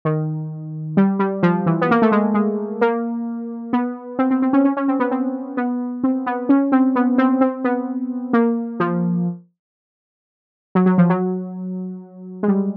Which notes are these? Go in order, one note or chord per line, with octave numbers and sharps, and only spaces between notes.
D#3
G3
G3
F3
E3
B3
A#3
A3
G#3
G#3
A#3
B3
C4
C4
C4
C#4
C#4
C#4
C4
B3
C4
B3
C4
B3
C#4
C4
B3
C4
C4
B3
A#3
F3
F#3
F#3
F3
F#3
G#3
G3